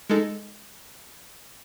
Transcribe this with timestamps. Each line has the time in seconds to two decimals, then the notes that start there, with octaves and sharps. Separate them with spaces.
0.09 G#3 D#4 A4